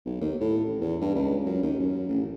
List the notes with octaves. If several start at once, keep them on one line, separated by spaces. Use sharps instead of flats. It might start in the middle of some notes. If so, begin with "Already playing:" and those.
B1
D#2
A2
A1
E2
G2
C#2
F#2
D#2
F#2
A1